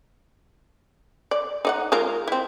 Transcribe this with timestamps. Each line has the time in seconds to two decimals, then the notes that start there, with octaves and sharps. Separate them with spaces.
1.31 D5
1.65 D#4 D5 F#5
1.92 G#3 F4 A#4
2.28 C4 E4